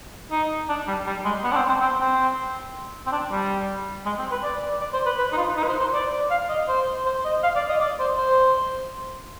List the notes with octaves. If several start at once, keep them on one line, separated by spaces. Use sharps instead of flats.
D#4
D4
G3
G3
G#3
B3
D4
C4
C4
C4
C4
C4
D4
G3
G#3
C4
B4
D5
D5
C5
B4
B4
D#4
F4
D#4
B4
C5
C5
D5
F5
D#5
C5
C5
D#5
F5
D5
D#5
D5
C5
C5